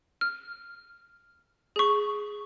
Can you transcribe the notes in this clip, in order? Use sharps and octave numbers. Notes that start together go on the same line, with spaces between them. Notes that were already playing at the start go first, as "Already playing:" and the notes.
F6
G#4 C#6